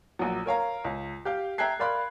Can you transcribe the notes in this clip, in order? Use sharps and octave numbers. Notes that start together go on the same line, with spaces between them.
A#1 F#3
A#4 C#5 F5 A#5
C#2
G4 F5 G6
E5 G5 A#5 F#6 G#6 C7
A#4 D5 F5 B5 C6 F#6